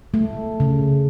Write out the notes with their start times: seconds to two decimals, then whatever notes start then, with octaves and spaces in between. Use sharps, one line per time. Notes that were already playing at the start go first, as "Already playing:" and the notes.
0.14 A3
0.60 C#3